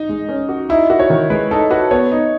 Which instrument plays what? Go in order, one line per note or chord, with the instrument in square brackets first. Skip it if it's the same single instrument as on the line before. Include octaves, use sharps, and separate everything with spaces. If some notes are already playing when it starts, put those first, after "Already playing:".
Already playing: [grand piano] D#4
[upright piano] G#3
C#4
F#4
[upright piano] D#4 [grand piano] E4
[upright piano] F#4
[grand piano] C#5
[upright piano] D#3
[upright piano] G#3 [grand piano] B4
[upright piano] D#4 [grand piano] A4
[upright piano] F#4 [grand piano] B4
[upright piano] B3 [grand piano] C#5
[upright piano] D#4